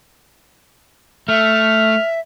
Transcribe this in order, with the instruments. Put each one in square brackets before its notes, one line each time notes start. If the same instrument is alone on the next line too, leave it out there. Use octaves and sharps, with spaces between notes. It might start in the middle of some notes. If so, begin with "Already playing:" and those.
[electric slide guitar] A3 [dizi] E5 [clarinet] F6